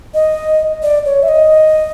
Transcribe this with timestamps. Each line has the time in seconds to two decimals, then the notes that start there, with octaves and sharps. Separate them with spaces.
0.14 D#5
0.83 D5
1.05 C#5
1.23 E5
1.28 D#5